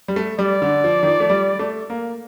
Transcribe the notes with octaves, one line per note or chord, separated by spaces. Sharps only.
G3
A3
G3 D5
D3
F3
D#3
F3
A3
G3
A3
A#3